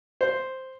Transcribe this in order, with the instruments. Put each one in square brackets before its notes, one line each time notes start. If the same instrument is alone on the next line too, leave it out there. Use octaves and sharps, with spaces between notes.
[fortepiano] C5